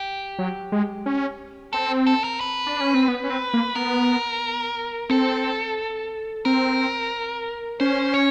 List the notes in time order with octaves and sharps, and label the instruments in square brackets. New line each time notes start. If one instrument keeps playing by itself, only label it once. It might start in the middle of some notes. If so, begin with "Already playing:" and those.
Already playing: [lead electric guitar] G4
[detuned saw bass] F#3
G#3
C#4
[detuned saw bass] C4 [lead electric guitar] A4
[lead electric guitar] A4
A#4
B4
[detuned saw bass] D4
C#4
C4
B3
C#4
C4
A#3
[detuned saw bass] B3 [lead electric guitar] A#4
[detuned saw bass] C4 [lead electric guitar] A4
[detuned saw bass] C4 [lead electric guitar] A#4
[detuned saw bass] C#4 [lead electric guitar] C5
[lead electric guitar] C#5